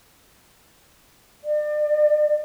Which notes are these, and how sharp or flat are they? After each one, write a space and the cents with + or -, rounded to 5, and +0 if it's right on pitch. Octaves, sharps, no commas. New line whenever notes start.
D5 +35